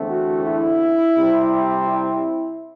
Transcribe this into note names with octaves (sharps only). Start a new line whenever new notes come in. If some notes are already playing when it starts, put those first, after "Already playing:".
Already playing: E2 D3 A3 C4
F#4
E4
C3 G3 C4
E4